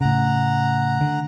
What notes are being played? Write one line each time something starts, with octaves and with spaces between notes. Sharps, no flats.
A2 C#3 F#5 A#5
D3